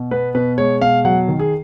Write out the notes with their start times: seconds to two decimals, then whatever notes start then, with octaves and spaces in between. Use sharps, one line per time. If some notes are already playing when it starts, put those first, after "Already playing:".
Already playing: B2
0.11 B3 B4
0.35 B2 B4
0.58 G#3 C#5
0.81 B2 F5
1.05 F#3 F#5
1.28 D#3
1.39 G#4